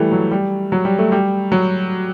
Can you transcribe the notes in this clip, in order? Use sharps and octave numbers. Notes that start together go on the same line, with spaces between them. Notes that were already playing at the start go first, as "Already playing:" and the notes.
Already playing: E3 G3 A3
F#3
G3
F#3
G3
A3
G3
F#3